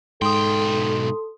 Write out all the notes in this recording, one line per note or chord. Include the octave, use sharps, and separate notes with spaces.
B1 G#2 A4 G5 C6 D#6